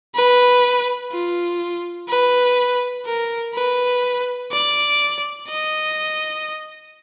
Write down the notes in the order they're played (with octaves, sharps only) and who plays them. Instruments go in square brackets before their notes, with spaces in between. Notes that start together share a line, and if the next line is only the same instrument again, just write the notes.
[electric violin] B4
F4
B4
A#4
B4
D5
D#5